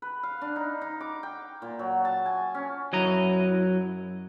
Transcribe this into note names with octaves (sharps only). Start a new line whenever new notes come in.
B4
F5
D4
D#4
D#4
D6
G5
A#2
F#3
A5
G#5
C#4
F#2 F#3 E4 D#5 A#5